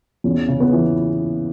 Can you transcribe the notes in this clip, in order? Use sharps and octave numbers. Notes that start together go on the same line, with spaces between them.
E2 C#4
C#3
B3
E3